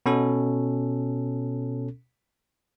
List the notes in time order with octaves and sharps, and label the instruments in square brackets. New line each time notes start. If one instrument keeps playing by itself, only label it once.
[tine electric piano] B2 C#4 A4